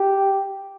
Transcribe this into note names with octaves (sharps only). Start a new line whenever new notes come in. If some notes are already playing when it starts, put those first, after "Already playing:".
Already playing: G4